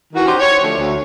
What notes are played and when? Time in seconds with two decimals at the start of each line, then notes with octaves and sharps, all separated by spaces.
0.14 D#3 E3 F#4
0.26 C#4 D#4 G4 C5
0.39 C#5
0.62 D3 F3 A3
0.77 D2